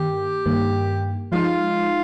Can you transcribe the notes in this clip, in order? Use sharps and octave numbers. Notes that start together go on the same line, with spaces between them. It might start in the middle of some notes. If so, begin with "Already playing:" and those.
Already playing: G2 D#3 A#3 G4
G2 D#3 A#3
F3 G#3 D#4 F4